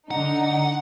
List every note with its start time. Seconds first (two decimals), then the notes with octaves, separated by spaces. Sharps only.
0.11 D3 D#4 F#5